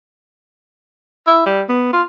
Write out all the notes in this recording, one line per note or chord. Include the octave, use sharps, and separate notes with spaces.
E4
G3
B3
F4